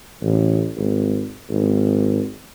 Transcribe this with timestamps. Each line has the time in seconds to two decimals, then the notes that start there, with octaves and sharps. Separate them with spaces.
0.22 A1
0.77 G#1
1.50 G#1